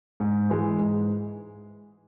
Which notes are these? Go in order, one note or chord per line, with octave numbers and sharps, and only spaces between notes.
G#2
E3 G#3
G#2